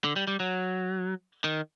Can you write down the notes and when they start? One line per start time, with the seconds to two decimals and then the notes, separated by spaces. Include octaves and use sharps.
0.04 D3
0.16 G3
0.27 G3
0.40 F#3
1.44 D#3